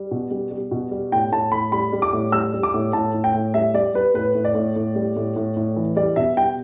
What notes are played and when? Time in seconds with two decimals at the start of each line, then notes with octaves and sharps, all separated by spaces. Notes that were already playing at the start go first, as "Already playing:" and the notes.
Already playing: G3
0.11 B2
0.31 G3
0.51 G3
0.71 B2
0.91 G3
1.12 A2 G5
1.32 A2 A5
1.52 A2 B5
1.72 G3 B5
1.93 G3
2.02 D6
2.13 A2
2.32 G3 E6
2.53 G3
2.63 D6
2.74 A2
2.93 A2 A5
3.14 A2
3.24 G5
3.34 A2
3.54 G3 E5
3.74 G3 D5
3.94 G3 B4
4.14 A2 B4
4.35 A2
4.45 D5
4.55 A2
4.76 A2
4.95 G3
5.16 A2
5.36 A2
5.56 A2
5.77 E3
5.96 G3 D5
6.16 B2 E5
6.37 G3 G5